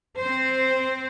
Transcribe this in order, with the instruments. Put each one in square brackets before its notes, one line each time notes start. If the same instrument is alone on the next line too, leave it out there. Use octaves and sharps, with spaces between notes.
[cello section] C4 C5